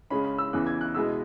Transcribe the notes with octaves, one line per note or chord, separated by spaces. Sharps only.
C#3 G#3 C#4 B5
B5
E6
E2 C#3 E3 F#6
G#6
F#6
B2 G#3 B3 E4 E6